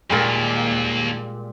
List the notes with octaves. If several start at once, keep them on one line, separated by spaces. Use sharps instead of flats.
D#2 A#2 G3 G#3